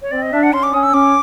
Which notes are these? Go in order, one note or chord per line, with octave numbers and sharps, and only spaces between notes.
C#5
C4 D5
D#5
D4 E5
F#5
C#4 C6
D6
C#4 D#6
E6
C#4 D6